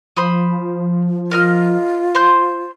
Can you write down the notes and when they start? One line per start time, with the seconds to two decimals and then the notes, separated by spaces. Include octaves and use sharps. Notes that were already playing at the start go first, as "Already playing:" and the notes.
0.17 F3 C5 B5 D#6
1.31 F4 A#4 D#5 F6
2.15 C5 C6 G6